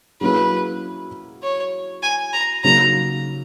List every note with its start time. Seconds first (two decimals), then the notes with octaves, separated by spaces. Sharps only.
0.21 F#3 A#3 C#4 E4 G#4 B4
1.43 C#5
2.03 G#5
2.33 A#5
2.64 C#3 F#3 A#3 D#4 A#5